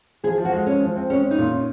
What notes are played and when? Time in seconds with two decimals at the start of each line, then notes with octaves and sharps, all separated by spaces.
0.24 F3 G#4
0.38 F3
0.45 F#4
0.53 G#3
0.66 G#3 C#4
0.80 F3
0.96 C4
1.10 G#3 C#4
1.23 C#4
1.31 D#4
1.38 A#2
1.53 C#4